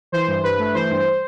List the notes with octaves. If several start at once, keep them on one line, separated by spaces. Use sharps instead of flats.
E3 C5
G2
G2 B4
A3
E3 C5
G2